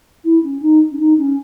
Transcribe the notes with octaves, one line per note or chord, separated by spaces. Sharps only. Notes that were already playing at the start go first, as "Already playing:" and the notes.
E4
C#4
D#4
C#4
D#4
C#4